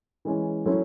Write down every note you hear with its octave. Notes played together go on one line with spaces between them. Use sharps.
E3 G#3 C#4
F#3 A3 C#4 E4